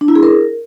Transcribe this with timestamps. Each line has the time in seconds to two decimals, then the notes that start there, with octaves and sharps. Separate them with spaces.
0.01 D4
0.08 E4
0.16 G#4
0.23 A#4